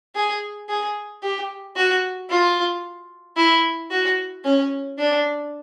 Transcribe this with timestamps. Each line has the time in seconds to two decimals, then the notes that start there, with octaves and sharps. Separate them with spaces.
0.15 G#4
0.69 G#4
1.22 G4
1.76 F#4
2.29 F4
3.37 E4
3.90 F#4
4.44 C#4
4.98 D4